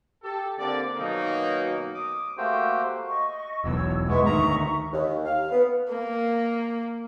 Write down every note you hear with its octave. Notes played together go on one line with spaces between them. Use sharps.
G4 A4
D3 A#3 C4 D5
B2 D#3 F#3 A#3 C#4 D#4
D6 D#6
A3 A#3 F#4 G4 C5 G5
D#5 C#6
E1 B1 E2 C#5 E6
G#2 G#3 B3 E5 C#6
D2 D#3 A#5
D#2
F5
B3
A#3